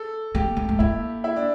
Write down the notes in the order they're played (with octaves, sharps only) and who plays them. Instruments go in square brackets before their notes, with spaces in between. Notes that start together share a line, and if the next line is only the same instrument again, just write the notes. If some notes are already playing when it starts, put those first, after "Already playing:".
Already playing: [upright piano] A4
[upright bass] A#3 [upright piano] G4
[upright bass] A#3
A3
[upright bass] A#3 [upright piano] E4
[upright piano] E4
D4